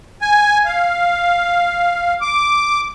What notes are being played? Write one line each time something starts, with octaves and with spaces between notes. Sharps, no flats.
G#5
F5
D6